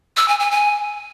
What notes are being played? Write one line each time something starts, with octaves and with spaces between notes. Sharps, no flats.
E6
G#5
G#5
G#5